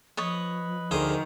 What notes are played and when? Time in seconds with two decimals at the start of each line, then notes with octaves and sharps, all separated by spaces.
0.17 F3 B4 C#5 D#5
0.91 D2 D#3 G#4 C5